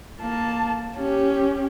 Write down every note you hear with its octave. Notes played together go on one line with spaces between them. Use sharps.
A#3 A5
C#4 G4